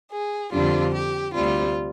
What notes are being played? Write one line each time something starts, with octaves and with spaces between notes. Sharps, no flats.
G#4
F2 D3 G3 D4 F4
G4
D2 C3 G3 F4